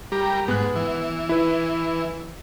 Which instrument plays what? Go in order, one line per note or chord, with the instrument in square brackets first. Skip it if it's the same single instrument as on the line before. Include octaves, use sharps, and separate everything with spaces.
[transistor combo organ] G3 A#4 [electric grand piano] G4
[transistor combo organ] G#2 [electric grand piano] B3 F#6
[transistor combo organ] E3
[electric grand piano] E4 B4